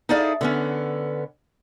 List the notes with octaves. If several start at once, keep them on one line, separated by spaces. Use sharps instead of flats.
D#4 E4 G#4 A4 D5 F5
D3 B3 C#4